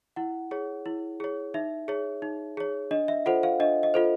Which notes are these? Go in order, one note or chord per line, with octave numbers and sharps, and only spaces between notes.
E4 F#5
G#4 C#5
E4
G#4 C#5
D#4 E5
G#4 C#5
D#4
G#4 C#5
D4 D#5
E5
F4 A4 C5 F#5
F5
D4 D#5
D#5
F4 A4 C5